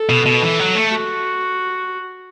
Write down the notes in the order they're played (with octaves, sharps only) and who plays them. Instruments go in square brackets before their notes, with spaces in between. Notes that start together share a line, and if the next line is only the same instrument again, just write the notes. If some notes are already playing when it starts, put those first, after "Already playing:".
Already playing: [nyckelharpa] A4
[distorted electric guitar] B2
B2
E3
F#3
A3
[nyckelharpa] F#4